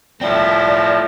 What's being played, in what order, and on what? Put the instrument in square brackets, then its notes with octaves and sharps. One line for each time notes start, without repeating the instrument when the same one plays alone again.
[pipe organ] A2 F3 [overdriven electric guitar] C4 E4 [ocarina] D5